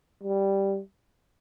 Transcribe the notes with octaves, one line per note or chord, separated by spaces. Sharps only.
G3